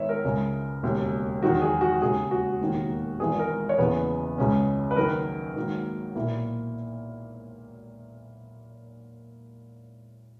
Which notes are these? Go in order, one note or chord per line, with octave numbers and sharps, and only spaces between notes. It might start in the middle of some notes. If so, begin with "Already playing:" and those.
Already playing: G#2 D#3 B3 C#5 E5
A#4
C#2 C#3 G#3
E1 D#2 C#3
E2 D#3 F#3 F#4
G#4
F#4
D#2 C#3 G#3 G#4
F#4
E1 D#2 D#3 A#3
G#1 G#2 E3 B3 G#4
A#4
C#5
F#1 E2 C#3 E3 B3 B4
C#2 C#3 G#3 C#4
B4
F#1 F#2 D#3 A#4
G#2 D#3 F#3 A#3
B1 A#2 A#3 E4